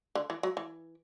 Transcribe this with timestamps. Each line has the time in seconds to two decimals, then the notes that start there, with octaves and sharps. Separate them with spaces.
0.15 D3
0.30 E3
0.43 F#3
0.57 E3